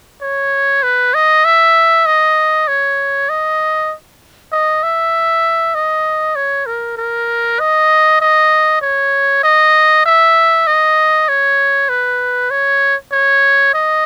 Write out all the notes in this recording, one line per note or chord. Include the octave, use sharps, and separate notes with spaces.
C#5
B4
D#5
E5
D#5
C#5
D#5
D#5
E5
D#5
C#5
A#4
A#4
D#5
D#5
C#5
D#5
E5
D#5
C#5
B4
C#5
C#5
D#5